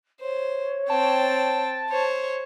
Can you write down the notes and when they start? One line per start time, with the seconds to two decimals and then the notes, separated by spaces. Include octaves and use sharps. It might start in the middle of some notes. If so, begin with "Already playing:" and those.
0.21 C5 C#5
0.90 C4 G5 A5
1.90 C5 C#5